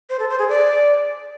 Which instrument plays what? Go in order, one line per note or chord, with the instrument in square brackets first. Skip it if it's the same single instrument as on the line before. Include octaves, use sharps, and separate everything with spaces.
[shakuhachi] C5
A4
C5
G#4
D5